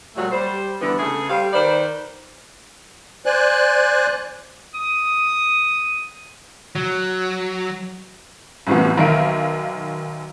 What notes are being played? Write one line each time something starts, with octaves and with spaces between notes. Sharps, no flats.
A#2 F#3 G3 A3
G3 C5
D3 E3 G3 B3
C#3 A3 G#4
G3 C5 F5
D#3 B4 C5 D5
C5 D5 G#5 F#6
D#6
F#3
C2 F#2 A2 E3 F3 B3
B1 D#3 E5 F5 D7